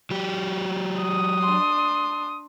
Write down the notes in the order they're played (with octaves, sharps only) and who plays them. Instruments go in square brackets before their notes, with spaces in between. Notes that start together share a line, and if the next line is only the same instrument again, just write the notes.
[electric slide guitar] F#3 G4
[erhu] D#6
[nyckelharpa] D4 C6